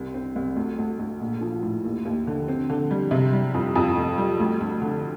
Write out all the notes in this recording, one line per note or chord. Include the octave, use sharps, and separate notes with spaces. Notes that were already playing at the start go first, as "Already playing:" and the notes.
Already playing: C2
C4
C2
D2
D2
D2
A#1
F3
A2
D#2
D#2
D3
C4
D3
G3
C3
G3
F2
F2
F1
G3
D2
D2
D3